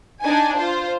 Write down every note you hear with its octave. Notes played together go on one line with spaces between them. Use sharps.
D4 D#4 G#5
F4 C5